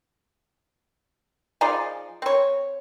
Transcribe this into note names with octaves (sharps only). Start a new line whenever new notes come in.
F3 D#4 G#4 D5
C4 C#5